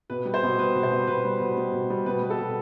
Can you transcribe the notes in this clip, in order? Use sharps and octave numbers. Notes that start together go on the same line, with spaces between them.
B2 B4
G3
C5
B2
G3 B4
B2
C5
G3
B2 B4
G3
B2
G3
B2
G3
B2 B4
G3 B4
A4
B2